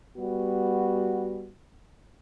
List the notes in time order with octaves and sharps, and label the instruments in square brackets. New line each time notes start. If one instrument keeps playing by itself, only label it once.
[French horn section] G3 B3 F#4